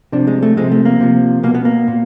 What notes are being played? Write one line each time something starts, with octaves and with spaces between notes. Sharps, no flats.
C3 F3 D4
G#3
A3
C3 F3 G#3
A3
A#3
C3 F3
B2 A#3
B3
A#3
A#2